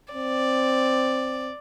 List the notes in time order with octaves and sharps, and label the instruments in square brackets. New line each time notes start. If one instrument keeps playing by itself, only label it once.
[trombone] C4 [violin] D5